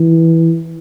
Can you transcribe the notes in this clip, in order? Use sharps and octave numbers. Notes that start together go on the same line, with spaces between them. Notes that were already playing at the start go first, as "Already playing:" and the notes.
Already playing: E3